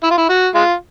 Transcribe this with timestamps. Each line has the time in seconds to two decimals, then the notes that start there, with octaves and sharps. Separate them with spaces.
0.03 E4
0.11 F4
0.18 E4
0.29 F#4
0.55 G#3 F4